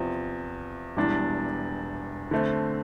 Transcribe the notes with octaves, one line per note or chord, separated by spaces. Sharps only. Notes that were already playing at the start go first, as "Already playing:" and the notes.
Already playing: E2 C3 F3 C4
E1 E2 E3 G3 D4
D3 A3 C4